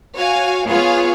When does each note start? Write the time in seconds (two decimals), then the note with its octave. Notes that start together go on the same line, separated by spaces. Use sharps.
0.15 F#4 C#5 F5 G#5
0.66 B3 F4 G#4 C#5 F5